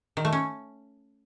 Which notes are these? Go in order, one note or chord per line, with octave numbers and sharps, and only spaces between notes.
D#3
A3
C#4